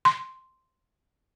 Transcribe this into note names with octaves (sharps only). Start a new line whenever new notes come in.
C6